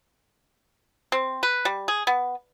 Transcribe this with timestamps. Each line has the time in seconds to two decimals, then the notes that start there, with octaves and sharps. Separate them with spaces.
1.12 C4
1.43 B4
1.65 G3
1.88 G#4
2.07 B3